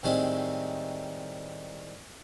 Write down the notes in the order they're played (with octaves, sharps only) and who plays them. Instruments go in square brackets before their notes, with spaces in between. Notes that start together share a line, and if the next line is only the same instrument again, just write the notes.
[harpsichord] A2 D#3 G3 G#3 C4 D#4